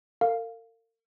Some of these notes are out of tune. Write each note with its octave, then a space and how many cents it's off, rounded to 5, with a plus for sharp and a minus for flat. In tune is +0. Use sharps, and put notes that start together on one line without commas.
A#4 -45 F5 +0